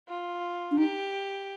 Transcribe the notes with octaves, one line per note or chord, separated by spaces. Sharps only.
F4
D4
D#4 G4